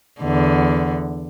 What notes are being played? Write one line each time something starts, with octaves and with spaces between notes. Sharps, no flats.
E2 D3